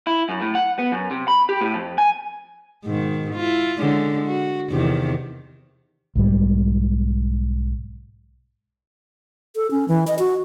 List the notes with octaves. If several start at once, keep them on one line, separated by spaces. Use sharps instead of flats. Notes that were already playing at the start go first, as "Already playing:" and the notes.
E4
F#2
A2
F#5
B3
F#2
C3
B5
G4
A2
F2
G#5
G#2 B2 D#3
E4 F4
D3 G#3 C#4
F#4
E2 C3 D#3
B1 G#2 G3
A4
C#4
E3
D#5
F#4